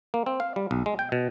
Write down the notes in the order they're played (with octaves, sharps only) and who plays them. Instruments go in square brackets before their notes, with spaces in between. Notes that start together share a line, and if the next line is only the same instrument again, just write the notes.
[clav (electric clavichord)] A#3
C4
F5
G3
B1
G#3
G5
B2